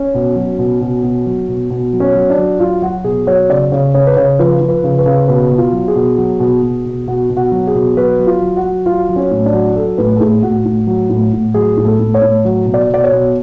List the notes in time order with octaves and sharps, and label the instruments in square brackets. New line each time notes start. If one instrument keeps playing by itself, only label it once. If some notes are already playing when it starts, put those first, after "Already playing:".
Already playing: [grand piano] C#4
B2
F#3
B2
B2
B2
F#3
B2
B2
F#3
C#4
F#3
D4
F#3
F#3 F4
F#3 F#4
B2 G#4
F#3 C#5
C#3 D5
C#3 C#5
C#3 C#5
B4
C#3 C#5
F3 B4
F3
B4
C#3
B4
C#3
B2 B4
B2
F4
F#3
G#4
B2
F#3
B2
B2
B2
B2 F#4
B2
F#4
F#3
G#4
B2
F#3 B4
F#3
F4
F#3
F#4
F#3
F#3 F4
F#3
C#4
A2
D4
F#3
F#3 A4
A2 B4
A4
A2 G#4
A2 F#4
A2
F#3
A2
A2
F#3 G#4
A2
A4
A2
C#5
A2
F#3
B2
D5
B2 D5
C#5
B2